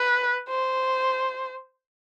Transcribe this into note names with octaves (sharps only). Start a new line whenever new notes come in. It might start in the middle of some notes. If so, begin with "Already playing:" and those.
Already playing: B4
C5